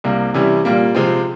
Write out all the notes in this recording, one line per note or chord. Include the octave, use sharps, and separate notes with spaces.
C2 C3 G3 A#3
C3 E3 G3 C#4 E4
A#2 G3 A#3
C3 F3 G#3 C4